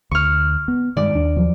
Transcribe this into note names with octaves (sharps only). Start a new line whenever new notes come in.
D2 C#6 F6
B3
G2 D#3 G#3 D5
D#2 D4
F3 F#3